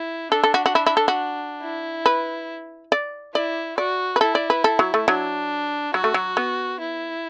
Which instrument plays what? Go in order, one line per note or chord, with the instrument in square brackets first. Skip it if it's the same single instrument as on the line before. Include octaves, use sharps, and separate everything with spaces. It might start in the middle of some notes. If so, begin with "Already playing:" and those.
Already playing: [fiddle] E4
[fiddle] D4 [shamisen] A4
[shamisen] A4
F#4
F#4
E4
E4
A4
F#4
[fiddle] E4
[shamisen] B4
D5
[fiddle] E4 [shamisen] D5
[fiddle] F#4 [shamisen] D5
[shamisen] B4
[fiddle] E4 [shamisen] A4
[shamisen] D5
B4
A4
F#3
A3
[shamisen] F#3 [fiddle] D4
[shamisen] F#3 [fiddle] F#4
[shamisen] A3
F#3
B3
[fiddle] E4